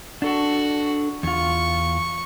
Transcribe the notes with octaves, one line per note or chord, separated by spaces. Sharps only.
D4 F#4 A4
E2 F4 C#6